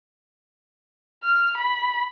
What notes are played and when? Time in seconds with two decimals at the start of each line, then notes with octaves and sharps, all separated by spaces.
1.23 F6
1.57 B5